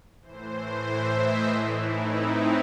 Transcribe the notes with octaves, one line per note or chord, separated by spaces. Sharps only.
A2 E3 C5
E5
D#5
A2 E3 E4
D#4
C4